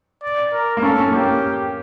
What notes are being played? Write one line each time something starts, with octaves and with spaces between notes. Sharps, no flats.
D5
A#4
A#3
C#4 A4
C#4
A#3 G4